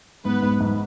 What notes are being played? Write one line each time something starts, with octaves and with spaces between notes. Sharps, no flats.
G#2 B3 B4
G#2
G#2